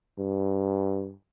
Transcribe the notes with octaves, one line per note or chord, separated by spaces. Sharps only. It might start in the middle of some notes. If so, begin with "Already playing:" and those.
G2